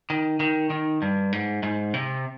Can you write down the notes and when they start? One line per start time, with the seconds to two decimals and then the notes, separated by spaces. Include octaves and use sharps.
0.10 D#3
0.40 D#3
0.70 D#3
1.02 G2
1.32 G#2
1.63 G#2
1.94 C3